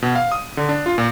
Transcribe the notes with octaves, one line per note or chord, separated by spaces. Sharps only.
B2
F5
D#6
D3
D4
F4
A#2